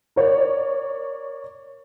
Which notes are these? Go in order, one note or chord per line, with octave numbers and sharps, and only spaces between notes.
A#4 C#5 D5